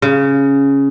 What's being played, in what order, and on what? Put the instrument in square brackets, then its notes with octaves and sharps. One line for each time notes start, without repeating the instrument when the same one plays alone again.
[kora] C#3